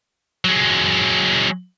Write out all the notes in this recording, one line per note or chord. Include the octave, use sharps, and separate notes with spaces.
F#3 G#3